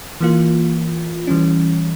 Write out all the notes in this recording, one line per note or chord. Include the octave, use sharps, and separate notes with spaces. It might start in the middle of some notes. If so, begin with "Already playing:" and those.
E3 A#3 F4
E3 G3 C#4